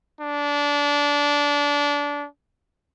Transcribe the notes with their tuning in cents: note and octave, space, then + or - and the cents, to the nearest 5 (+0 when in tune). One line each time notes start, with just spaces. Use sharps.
D4 -20